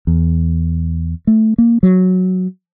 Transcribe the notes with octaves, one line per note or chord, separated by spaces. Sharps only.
E2
A3
A#3
F#3